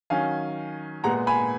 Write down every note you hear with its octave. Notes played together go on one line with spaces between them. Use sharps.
D#3 F#3 C#4 F5 G#5
A#2 G#3 B3 F#5 A#5
G#5 B5